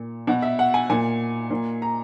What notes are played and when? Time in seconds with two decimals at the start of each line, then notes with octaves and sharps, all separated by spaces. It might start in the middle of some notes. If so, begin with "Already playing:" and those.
Already playing: A#2
0.27 B2 F#5
0.42 E5
0.59 F#5
0.74 G#5
0.90 A#2 G#5
1.51 A#2
1.82 A#5